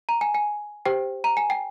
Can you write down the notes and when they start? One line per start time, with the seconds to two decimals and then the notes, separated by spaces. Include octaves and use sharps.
0.09 A#5
0.21 G#5
0.35 G#5
0.85 G4 C5 G5
1.24 A#5
1.37 G#5
1.50 G5